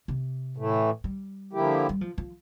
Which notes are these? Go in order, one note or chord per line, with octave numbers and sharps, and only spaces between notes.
C3
A2 E3 A3
G3
D3 F3 A#3 E4 G4
G3
F3
F3